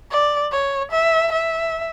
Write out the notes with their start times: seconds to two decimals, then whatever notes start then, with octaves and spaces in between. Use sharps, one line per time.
0.11 D5
0.52 C#5
0.92 E5
1.32 E5